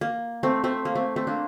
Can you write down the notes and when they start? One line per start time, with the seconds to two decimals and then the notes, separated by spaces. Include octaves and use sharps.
0.01 A#3
0.43 A3 C4
0.64 A3 C4
0.85 A#3
0.95 A3 C4
1.16 A3 C4
1.27 A#3 D4